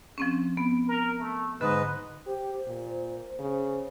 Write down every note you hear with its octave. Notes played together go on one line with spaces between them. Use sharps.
F3 C4 C#4
B3
A#4
A3
G#2 D3 B4 D#5
G4 C5
A#2
C#3